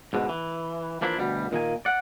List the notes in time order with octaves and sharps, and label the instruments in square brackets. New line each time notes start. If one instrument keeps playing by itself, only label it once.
[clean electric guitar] G#2 B2 D3
E3
E3 F3 A#3 D4 E4
D2 B2 G3
A#2 D#3 A#3 G#5
D5 F#5